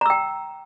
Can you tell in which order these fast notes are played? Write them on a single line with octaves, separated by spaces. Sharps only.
A#5 E6 G5